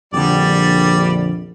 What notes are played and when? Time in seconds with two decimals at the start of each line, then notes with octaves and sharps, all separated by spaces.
0.14 A#1 F2 D3 G3 D5